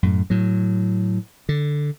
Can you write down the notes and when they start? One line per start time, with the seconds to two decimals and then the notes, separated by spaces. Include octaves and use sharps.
0.03 F#2 A2
0.30 A2 F#3
1.49 D3